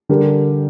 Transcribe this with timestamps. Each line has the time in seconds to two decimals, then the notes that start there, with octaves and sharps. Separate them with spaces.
0.09 D3 G3 D4 G4 A#4